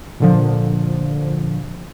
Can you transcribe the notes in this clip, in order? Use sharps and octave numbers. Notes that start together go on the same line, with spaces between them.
A#2 D3 F3